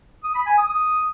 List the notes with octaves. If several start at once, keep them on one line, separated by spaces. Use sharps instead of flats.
D#6
B5
G#5
D#6
D#6